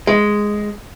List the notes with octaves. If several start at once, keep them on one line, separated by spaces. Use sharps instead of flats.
G#3